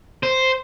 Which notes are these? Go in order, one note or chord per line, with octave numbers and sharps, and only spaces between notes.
C5